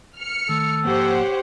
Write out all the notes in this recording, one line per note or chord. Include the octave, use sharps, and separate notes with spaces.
F6 C#7
D#3 A3 A4
G#2 F3 A#3 G4 C5 C#5 F#5